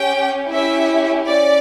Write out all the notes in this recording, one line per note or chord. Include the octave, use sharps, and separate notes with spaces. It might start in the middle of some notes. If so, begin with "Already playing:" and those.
Already playing: C#4 G4 G5
C#4 E4 G4 E5
C#4 D5